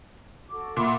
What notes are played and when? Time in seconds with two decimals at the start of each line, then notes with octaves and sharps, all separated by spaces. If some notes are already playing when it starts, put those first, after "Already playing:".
0.50 F#4 A4 D6
0.77 A#2 E5 F#5 B5